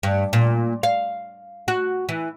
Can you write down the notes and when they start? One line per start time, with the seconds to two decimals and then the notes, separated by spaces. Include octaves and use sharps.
0.03 G2
0.33 A#2
0.83 F5
1.68 F#4
2.09 E3